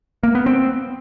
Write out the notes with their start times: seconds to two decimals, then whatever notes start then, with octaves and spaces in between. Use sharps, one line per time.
0.23 A#3
0.35 B3
0.46 C4